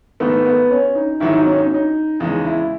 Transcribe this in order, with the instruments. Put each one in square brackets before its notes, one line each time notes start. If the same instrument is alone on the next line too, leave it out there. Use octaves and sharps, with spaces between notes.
[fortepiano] G#2 D#3 A3 [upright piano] B3
[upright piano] B3
C#4
D#4
[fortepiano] G#2 D#3 F#3 [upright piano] E4
[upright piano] D#4
C#4
D#4
C#4
D#4
[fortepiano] E2 C#3 G#3 [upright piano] D#4
[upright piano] E4